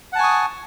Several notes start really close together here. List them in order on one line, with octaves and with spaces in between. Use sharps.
F#5 A5 G#5 C#6 D#6